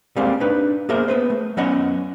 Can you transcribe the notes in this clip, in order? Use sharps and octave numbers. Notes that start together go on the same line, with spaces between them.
G3 G#3 A#3 C4 F5
D4 D#4 B4
A#3 B3 G#4 A#4 C5 E5
B3 B4 C5
A3
F#3 B3 C#4 C#5 D#5 F#5